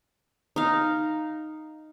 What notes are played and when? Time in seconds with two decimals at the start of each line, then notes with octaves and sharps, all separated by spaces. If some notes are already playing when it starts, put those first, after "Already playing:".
0.56 D#4 F5